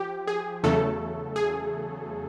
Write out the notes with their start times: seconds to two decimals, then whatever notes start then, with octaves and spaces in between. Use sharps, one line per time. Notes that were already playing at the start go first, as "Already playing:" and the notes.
Already playing: F3 G4
0.28 G#4
0.64 E2 C#3 F#3 A3 A4
1.36 G#4